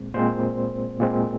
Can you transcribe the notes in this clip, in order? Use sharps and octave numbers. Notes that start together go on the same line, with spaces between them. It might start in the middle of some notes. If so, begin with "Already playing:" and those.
Already playing: A#2 G#3 C4
A#2 G#3 C4 C5
A#2 G#3 C4